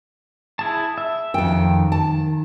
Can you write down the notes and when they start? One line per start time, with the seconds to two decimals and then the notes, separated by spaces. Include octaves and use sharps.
0.59 E4 G#4 A5
0.98 E5
1.34 F2 D#3 G5
1.92 A5